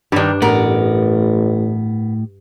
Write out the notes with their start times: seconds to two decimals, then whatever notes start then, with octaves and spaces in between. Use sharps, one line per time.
0.12 G2 D#3 G3 D4
0.42 A1 A2 B3 A#4